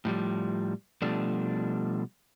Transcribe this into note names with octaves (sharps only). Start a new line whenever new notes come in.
A2 F3 G3
B2 F3 G3 A3 D4